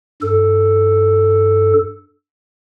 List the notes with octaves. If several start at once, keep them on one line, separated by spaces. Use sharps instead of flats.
G2 A4